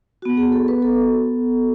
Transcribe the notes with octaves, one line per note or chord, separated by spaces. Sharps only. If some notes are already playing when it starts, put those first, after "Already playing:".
B3 F#4
G#4
A4
B4
A4